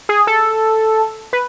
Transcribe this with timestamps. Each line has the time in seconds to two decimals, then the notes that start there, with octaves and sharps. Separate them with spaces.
0.09 G#4
0.27 A4
1.33 B4